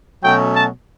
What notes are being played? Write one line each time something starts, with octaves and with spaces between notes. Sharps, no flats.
B2 F#3 A3 C#4 G5
A5